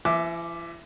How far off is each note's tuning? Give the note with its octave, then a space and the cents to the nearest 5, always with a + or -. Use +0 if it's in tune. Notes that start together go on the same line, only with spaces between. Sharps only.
E3 +45 E5 +5 D6 +0